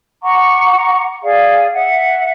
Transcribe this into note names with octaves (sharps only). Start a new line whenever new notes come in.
F#5 A#5 C#6 D6
G#4 D5 F5
E5 F#5